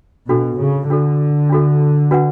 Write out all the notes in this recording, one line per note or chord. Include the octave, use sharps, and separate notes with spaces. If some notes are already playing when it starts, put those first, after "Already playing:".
B2 D4 F#4 A4
C#3
D3 D4 F#4 A4
D4 F#4 A4
D4 F#4 B4 F#5